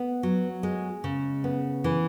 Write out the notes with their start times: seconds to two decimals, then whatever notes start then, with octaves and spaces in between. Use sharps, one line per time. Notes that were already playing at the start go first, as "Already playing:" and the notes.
Already playing: B3
0.23 F#3
0.63 G#3
1.04 C#3
1.44 B3
1.84 E3